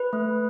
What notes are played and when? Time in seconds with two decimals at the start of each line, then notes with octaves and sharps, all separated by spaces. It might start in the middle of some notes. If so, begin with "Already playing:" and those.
Already playing: B4
0.13 A3